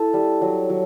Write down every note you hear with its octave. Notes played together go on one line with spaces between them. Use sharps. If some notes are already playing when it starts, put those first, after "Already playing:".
Already playing: E4 A4 A5
G3
F#3
F#3